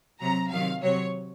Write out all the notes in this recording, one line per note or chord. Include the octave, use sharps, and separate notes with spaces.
C3 F#3 A#5
C3 D#3 F#3 F5
C3 F#3 C#5